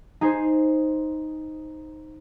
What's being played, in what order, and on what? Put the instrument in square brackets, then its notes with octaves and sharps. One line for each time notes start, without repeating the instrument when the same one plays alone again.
[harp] D#4 G#4 C5